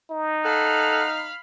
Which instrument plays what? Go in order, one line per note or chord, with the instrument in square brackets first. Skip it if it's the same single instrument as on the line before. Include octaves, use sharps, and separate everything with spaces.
[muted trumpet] D#4
[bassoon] A4 [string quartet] F5 B5 F6 [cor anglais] F#5